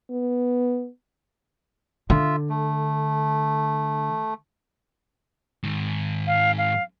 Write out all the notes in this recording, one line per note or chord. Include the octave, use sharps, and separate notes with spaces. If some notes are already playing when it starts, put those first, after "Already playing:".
B3
D3 F4 E5
A3
G#2 D#3
F5
F5